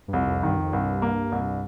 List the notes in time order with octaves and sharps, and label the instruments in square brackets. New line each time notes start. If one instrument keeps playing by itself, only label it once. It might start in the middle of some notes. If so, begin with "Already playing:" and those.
[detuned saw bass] G2
[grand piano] C2 [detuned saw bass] F2
[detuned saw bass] F2
[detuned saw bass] G2 [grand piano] D#3
[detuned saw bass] F2
[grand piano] C2 [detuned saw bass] G2
[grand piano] A#3
C2